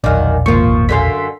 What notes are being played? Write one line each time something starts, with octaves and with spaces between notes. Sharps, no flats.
E1 A#1 F#2 D#3 D5 F5
G#1 F3 A#3 F4 C#6
F#2 D3 F5 C6 B6